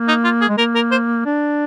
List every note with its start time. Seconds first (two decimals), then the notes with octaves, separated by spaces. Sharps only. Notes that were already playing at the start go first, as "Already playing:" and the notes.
Already playing: A#3
0.08 D#4
0.24 F4
0.41 G#4
0.48 G#3
0.58 A#3 A#4
0.75 A#4
0.91 C5
1.25 D4